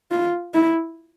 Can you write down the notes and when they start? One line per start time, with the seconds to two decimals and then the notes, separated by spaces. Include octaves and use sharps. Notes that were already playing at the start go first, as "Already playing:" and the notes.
0.11 F4
0.54 E4